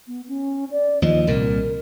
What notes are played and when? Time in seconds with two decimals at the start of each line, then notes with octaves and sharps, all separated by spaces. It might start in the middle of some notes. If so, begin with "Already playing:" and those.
0.08 B3
0.28 C#4
0.71 D5
1.02 D#2 F3 D#5
1.27 C2 A#2 A#4